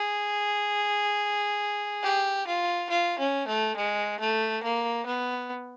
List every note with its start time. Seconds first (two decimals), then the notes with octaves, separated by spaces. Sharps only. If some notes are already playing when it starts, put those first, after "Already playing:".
Already playing: G#4
2.03 G4
2.47 F4
2.89 F4
3.19 C#4
3.47 A3
3.76 G#3
4.19 A3
4.63 A#3
5.06 B3